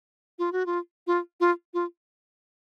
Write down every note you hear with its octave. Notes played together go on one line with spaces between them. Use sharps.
F4
F#4
F4
F4
F4
F4